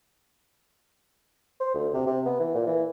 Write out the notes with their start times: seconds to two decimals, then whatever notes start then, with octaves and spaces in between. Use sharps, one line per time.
1.60 C5
1.74 D2
1.94 C3
2.06 C3
2.25 B3
2.40 E3
2.55 A#2
2.67 E3